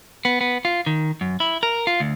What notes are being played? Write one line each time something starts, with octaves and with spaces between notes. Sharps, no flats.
B3
B3
F4
D#3
F#2
E4
A#4
F4
D2